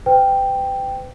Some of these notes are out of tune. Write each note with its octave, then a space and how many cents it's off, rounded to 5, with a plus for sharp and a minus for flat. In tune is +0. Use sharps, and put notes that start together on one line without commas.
B4 +40 G5 +0